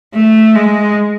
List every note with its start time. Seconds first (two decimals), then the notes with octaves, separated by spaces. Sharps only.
0.14 A3
0.56 G#3